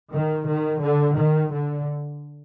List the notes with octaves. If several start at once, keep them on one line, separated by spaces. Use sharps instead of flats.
D#3
D#3
D3
D#3
D3